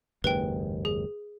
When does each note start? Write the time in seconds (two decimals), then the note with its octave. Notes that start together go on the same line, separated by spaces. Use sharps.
0.24 F#1 D#2 G#2 B4 G5
0.85 G#4